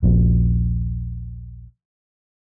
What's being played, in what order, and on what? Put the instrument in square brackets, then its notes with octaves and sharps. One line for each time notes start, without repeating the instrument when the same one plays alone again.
[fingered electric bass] D#1 A#1